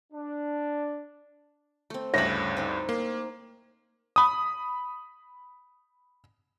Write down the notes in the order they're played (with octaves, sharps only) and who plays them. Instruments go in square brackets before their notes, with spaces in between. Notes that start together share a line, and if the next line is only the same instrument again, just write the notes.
[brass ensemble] D4
[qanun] A3 C4
[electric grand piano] D2 G2 [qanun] C#3 E4 B5 [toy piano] E5
[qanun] C4 D#4
[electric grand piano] A#3 [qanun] C6
[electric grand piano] B5 D#6